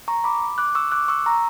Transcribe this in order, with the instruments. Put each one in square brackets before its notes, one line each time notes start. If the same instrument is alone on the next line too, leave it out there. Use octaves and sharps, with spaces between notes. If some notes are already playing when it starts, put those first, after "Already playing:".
[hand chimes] A#5 C#6
B5 D6
D6 F#6
C#6 E6
D6 F#6
C#6 E6
A#5 C#6